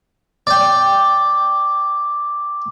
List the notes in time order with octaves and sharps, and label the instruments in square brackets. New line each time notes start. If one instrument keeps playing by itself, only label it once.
[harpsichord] D5 G5 [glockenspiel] D6